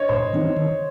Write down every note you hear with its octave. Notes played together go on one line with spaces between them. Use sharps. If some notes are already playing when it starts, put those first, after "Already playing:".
Already playing: C#5 D#5
A2 C5
E3 C4 D#4
D#3